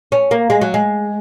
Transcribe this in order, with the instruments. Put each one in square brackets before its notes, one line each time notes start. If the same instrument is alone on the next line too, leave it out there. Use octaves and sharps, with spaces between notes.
[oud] C#4
A#3
G#3
F#3
G#3